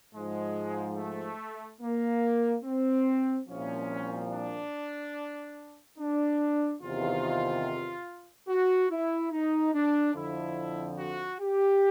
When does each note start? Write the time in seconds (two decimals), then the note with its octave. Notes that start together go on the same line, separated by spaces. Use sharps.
0.14 G#2 F3 G#3
0.97 A3
1.81 A#3
2.64 C4
3.47 C2 A#2 F3 C#4
4.32 D4
5.99 D4
6.81 E2 C3 D#3 F4
8.48 F#4
8.90 E4
9.31 D#4
9.73 D4
10.14 F2 D3 F3 E4
10.98 F#4
11.40 G4